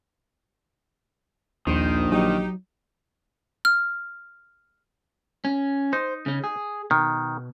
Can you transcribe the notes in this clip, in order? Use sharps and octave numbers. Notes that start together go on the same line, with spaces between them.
A#1 D#2 D#3 C5
F#3 D#4 G4
F6
C#4
D#4 C5
C#3 C#4
G#4
B2 D#3